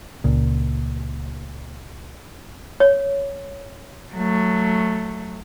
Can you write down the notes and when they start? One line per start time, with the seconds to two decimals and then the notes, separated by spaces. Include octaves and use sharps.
0.24 C#2 A#2
2.80 C#5
4.13 F#3 A3